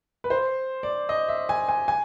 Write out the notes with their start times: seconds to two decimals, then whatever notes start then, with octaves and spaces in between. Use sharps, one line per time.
0.24 B4
0.30 C5
0.83 D5
1.09 D#5
1.28 E5
1.49 G#5
1.68 G#5
1.88 G#5